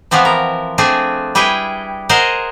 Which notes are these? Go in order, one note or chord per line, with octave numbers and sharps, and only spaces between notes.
E3 F3 B3 C4 E4
A#4
A3 C4 D4 G#4
G3 E4 G#4 B4 G5
G#4 A#4 C5 D#5 F#5